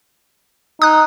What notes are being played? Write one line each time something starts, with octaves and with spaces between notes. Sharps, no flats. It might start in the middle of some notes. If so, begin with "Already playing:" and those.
D#4 D#6 F#6